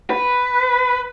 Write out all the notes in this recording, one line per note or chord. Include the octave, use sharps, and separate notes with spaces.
B4